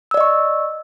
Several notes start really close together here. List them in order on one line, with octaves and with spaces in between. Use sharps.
E6 D5 D#5 C#6